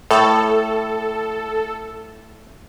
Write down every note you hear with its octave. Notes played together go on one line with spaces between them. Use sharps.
A2 A4